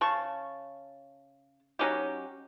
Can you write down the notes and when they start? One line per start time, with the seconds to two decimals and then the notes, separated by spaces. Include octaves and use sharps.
0.01 C#3 A5 C#6
1.79 F#3 C#4 D#4 G4